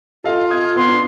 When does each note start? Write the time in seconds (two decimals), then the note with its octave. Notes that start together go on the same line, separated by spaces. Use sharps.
0.24 F4 A4 D#5 F5
0.50 D#6 G#6
0.76 B3 C6
0.88 D4